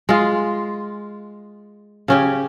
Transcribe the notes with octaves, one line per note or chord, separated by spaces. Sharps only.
G#3 F4
C#3 C#4 G4